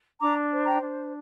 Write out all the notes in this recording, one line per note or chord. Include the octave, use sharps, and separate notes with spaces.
D4 A#5 D6
C5
G5 A#5
D4